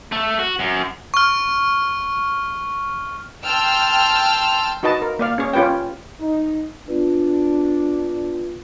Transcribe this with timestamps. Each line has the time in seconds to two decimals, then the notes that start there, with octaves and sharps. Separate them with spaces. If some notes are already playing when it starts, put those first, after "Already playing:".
0.12 A3
0.39 F#4
0.59 F#2
1.14 C#6 F6
3.44 G5 A5 C6 E6 F6
4.83 D#4 F#4 B4 D#5 A5
5.02 A#4
5.19 A#3 D5 F5
5.38 C#4 G#4 C#5
5.53 C#4 F4 G4 B4 G5
6.19 D#4
6.88 B3 D4 F4 B4